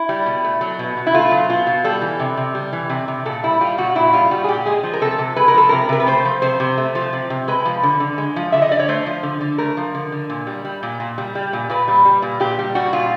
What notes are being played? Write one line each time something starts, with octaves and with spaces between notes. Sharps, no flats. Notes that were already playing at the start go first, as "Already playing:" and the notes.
Already playing: E4
G3
B2
A3
F#3
B2
B2
E4
A3 F4
F#3
B2 F4
B2
G3 A4
E3
C3
C3
G3
E3
C3
C3
A#2 A4
G3 E4
G3 F4
A#2 F#4
A#2 E4
G3 F4
G3 F#4
G#4
A#2 G4
G#3 G#4
F3
A#4
C3 A4
C3
G#3 B4
A#4
F3 A4
C3 A#4
C3 A#4
B4
A3 C5
F3
C3 C5
C3
A3
F3
C3
C3
G#3 B4
F3
D3
D3
G#3
F3
D3 E5
D#5
D3 D5
C#5
A3 C5
F3
D3
D3
A3 A#4
F3
D3
D3
A#2
G3
G3
A#2
A#2
G3
G3
A#2
A#2 B4
G3
G3
A#2
A#2 G4
G3
G3 F#4
A#2 F4